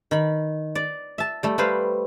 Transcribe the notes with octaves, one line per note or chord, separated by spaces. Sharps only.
D#3 B5
D5
E5 A5
G3 A3
G3 B4 C5 F5